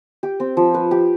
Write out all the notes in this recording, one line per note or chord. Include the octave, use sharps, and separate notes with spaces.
G4
C4
F3
B4
G4